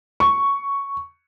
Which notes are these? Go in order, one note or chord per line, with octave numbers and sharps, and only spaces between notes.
C#6